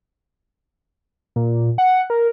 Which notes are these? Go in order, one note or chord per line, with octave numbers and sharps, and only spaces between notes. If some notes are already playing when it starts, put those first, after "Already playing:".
A#2
F#5
A#4